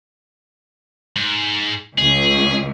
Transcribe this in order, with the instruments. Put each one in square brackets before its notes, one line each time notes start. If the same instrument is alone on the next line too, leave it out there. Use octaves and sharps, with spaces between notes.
[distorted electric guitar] G#2
[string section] C#2 [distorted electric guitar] G#4